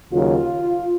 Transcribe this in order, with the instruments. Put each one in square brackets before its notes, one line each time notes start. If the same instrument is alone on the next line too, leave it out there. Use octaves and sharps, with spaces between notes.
[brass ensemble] D#2 C#3 F#3 F4